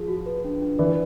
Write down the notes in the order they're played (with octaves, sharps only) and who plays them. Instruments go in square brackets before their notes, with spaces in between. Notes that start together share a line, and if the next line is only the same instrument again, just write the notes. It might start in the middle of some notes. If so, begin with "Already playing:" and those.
Already playing: [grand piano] F3 [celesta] G#4
[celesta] F#4
B4
D4
D4
[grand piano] E3 [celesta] D5